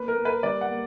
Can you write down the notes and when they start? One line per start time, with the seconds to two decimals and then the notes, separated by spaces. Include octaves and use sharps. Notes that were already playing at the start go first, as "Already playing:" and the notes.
Already playing: A#3 B4
0.08 A#4
0.16 A#3
0.25 B4
0.43 G3 D5
0.61 F#5
0.71 A#3